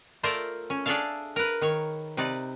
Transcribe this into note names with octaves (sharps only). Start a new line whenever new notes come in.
A3 F4 A#4 C5 D5 E5
C#4
D4 G#4 A4 D5 E5 F5
A#4 B4
D#3 C#5
C3 D#4 B4 D5